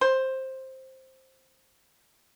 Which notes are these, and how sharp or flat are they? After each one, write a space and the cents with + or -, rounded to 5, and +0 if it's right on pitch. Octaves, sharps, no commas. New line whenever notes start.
C5 +10